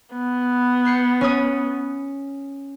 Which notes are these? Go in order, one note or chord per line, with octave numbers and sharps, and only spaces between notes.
B3
G6 C7 C#7
C#4 C#5 D#6